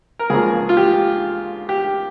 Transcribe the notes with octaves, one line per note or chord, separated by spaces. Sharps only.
A#4
C#2 C#3 F3 A#3 G#4
F4
G4
G4